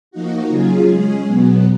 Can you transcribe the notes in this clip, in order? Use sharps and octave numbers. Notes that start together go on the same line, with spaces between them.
F3 A#3 D#4 F#4
C#3 F#3 C#4 F4 G#4
G#3 C#4 G#4
B2 F#3 B3